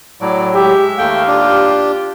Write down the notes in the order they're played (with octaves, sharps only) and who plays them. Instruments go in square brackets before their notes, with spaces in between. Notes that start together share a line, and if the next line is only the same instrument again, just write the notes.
[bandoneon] A2 F#3 [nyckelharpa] D5
[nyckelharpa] G#3 E5 [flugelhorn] G4
[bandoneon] D#2 [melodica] A3 G5 [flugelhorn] F5
[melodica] D4 [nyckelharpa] F4 G4